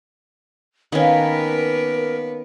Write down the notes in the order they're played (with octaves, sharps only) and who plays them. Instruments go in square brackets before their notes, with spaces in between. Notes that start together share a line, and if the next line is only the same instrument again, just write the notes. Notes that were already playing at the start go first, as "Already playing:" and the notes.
[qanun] D#3 C#4 [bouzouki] A#3 D4 F4 [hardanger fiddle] B3 B4 [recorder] A#4